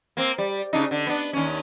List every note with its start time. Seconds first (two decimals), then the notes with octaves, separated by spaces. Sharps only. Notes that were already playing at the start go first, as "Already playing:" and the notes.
0.17 A#3 C4
0.38 G3
0.73 C#3 D4 D#4
0.91 D3
1.07 B3 D4
1.33 D#2 C#4